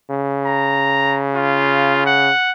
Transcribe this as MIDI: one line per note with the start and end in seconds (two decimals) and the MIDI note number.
0.11 2.30 49
0.45 1.21 82
1.35 2.02 65
2.06 2.52 78